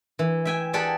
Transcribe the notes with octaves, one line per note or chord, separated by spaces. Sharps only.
E3
E5 G5 G#5
G4 G#4 D5 F#5 G5 A5